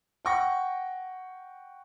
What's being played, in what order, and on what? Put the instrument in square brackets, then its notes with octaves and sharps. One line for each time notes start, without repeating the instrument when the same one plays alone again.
[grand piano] F#5 G5 C#6 A#6